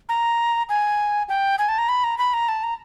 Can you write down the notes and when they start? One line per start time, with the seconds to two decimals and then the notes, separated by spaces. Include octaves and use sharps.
0.09 A#5
0.69 G#5
1.29 G5
1.59 G#5
1.69 A5
1.78 A#5
1.89 B5
2.04 A#5
2.18 B5
2.34 A#5
2.48 A5
2.63 A#5